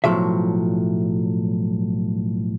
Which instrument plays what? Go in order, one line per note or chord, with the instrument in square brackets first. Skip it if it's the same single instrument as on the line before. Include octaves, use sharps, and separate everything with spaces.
[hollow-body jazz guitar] B1 A2 F3 F#3 E5